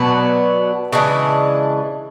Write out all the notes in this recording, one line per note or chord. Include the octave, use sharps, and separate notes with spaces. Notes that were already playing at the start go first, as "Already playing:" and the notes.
Already playing: B2 F#3 B3 D4
C#3 E3 G#3 D4